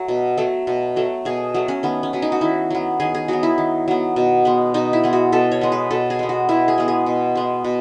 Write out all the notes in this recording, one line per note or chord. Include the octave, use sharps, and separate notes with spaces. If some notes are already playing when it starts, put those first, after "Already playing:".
Already playing: F#3 A3
B2
F#3 A3
B2
F#3 A3
B2 G#4
F#3 A3
C#4
D#3 B3
C#4
F#3 B3
D#4
F#4
D#3 E4
F#3 B3
D#3 G#4
G#4
F#3 B3 F#4
E4
D#3
F#3 B3
B2
G#3 B3
B2 D#4
E4
G#3 B3
F#4
B2 A4
C#5
G#3 B3
B4
B2 A4
G#4
G#3 B3
F#4
B2 E4
G#4
G#3 B3
G#4
B2
G#3 B3
B2